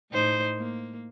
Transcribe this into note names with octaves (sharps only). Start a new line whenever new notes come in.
A2 D#4 C5
A#3